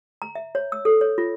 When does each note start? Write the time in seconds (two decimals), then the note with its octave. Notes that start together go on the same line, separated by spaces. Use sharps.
0.22 A#5
0.35 E5
0.55 C#5
0.72 E6
0.85 A4
1.01 C#5
1.18 F4